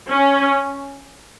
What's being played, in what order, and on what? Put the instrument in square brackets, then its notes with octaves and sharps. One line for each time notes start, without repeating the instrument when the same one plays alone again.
[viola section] C#4